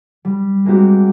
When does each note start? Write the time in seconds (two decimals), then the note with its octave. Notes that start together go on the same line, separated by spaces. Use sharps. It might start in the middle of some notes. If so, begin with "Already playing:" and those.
0.25 G3
0.65 G#3 A#3 C4 F#4 G4